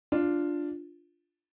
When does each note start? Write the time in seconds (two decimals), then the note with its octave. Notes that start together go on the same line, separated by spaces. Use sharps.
0.12 D4 F4